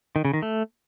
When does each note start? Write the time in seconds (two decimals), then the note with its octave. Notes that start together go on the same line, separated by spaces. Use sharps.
0.16 D#3
0.25 C#3
0.33 D#3
0.42 A3